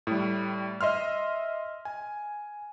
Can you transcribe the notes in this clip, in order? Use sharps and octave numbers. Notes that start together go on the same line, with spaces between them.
A2 G3
D#5 E5 C6 F6
G#5